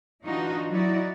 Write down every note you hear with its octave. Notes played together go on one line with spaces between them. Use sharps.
E3 D4 D#4 F4 F#4
F#3 D#4 E4 F#4 D5